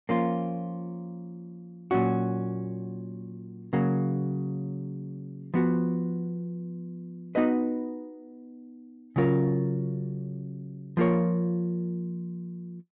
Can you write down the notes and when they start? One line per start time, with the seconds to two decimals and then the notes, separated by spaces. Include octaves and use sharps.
0.09 F3 A#3 C#4 F4
1.91 A#2 F#3 C#4 F#4
3.73 C#3 F#3 A#3
5.54 F3 B3 F#4
7.35 B3 D#4 F#4 B4 D#5
9.16 C#3 F#3 C#4 F4 A#4
10.97 F3 A#3 F4 A#4 C#5